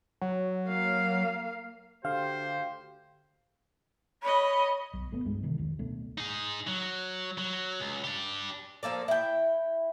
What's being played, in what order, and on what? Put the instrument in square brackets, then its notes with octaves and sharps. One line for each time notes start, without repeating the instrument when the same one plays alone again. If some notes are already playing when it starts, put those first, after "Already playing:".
[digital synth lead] F#3
[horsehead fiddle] A#3 F5
[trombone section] D2 G4 [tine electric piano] D3 [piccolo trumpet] C5 [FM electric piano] F5
[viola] C#5 D#5 [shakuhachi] B5
[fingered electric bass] B1
G#1 A3 B3
C2 G2 G#3
C3 D#3 E3
F1 C#2 D#3
D1 B2 A3 D4
[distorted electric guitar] D#4 G#4
F#3
F#3
C#2
D4 G4
[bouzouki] F3 A#3 A4 D5
E4 G5